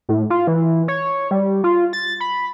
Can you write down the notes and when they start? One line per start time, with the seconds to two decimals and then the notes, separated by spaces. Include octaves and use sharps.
0.09 A2
0.30 F4
0.47 E3
0.88 C#5
1.31 G3
1.64 F4
1.93 A6
2.21 B5